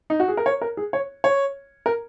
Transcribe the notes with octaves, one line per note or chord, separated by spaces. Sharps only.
D#4
F#4
G#4
A#4
C#5
A#4
G#4
C#5
C#5
A#4